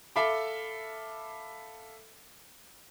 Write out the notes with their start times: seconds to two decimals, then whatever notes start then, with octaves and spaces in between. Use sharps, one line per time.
0.16 A4 E5 F5 B5 D6